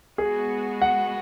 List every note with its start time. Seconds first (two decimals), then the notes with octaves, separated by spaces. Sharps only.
0.18 G#3 B3 F#4 G#4
0.82 F#5